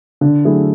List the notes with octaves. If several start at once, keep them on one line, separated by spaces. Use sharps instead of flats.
D3
F#3 A3 E4 G#4